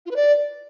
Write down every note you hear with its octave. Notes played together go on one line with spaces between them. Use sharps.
F4
B4
D5